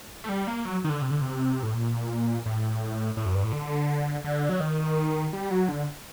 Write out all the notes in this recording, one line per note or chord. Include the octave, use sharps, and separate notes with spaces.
A3
G3
A#3
F#3
D#3
D3
C3
D3
C3
A2
A#2
A2
A2
F#2
G2
A2
D3
D3
F#3
D#3
G3
F#3
D3